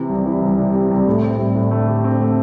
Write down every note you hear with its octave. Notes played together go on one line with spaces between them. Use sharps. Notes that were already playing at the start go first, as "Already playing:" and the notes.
Already playing: C3 E3
C2 G3
E3
C2
C3
C3
C2
A2 A3
C4
A2 G3
A2
D3 A3
G4
D3 C4
A3